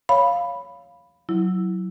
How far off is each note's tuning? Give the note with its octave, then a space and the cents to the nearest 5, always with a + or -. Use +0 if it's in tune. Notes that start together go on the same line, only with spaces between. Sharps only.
C#5 +10 F5 +0 B5 +0
F#3 +0 E4 +0